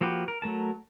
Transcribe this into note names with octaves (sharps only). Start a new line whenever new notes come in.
F3 A#3 F#4 G4 B4
A#4
F#3 A3 A#4 A5